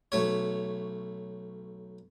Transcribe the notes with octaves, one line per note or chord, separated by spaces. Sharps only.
B1 A3 C#5